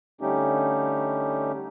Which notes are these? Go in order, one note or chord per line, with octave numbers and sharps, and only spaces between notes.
D3 G3 A3 C#4 D#4 G4